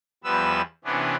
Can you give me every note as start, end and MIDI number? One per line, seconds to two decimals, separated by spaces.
0.24 0.61 40
0.24 0.61 53
0.24 0.61 55
0.24 0.61 59
0.24 0.61 71
0.24 0.61 88
0.85 1.16 48
0.85 1.16 52
0.85 1.16 59
0.85 1.16 61
0.85 1.16 62